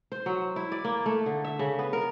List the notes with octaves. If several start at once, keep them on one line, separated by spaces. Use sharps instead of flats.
C5
F#3
E4
D5
A#3
A3
D3
E5
C#3
B3
A#4